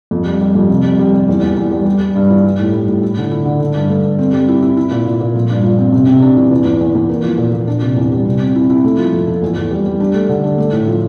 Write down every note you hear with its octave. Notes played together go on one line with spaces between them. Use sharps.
F2
G3
G3
F2
C3
G3
G3
G3
E2
E2
E2
G3
G3
G3
G2
E3
G3
A2
G3
A2
E4
D3
E4
D3
D3
G2
A3
G2
C4
G3
E4
E4
E4
A#2
A#2
A#2
F3
G2
F3
C4
C3
C3
D4
E3
E2
E2
E2
E2
A#3
F3
A#2
A#2
D4
C3
E2
G3
C3
C4
E4
E4
A3
F3
F2
A3
E2
E2
G3
G3
D4
A3
D3
D4
A3
A2
F3